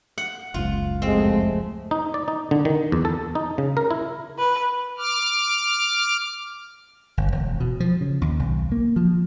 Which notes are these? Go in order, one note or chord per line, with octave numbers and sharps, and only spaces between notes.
F#5
F#1 C#2 G#2 F4
F2 C3 G#3 A3 C4
D#4
D5
D#4
D3
D#3
E2
A4
D#4
C#3
A#4
E4
B4
D6 F6
G1
E1
B2
F3
C#3
D#2
B1
A#3
F3